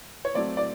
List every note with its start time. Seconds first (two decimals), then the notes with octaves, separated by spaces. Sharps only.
0.25 C#5
0.34 F#3 A3 C4 D5
0.57 D5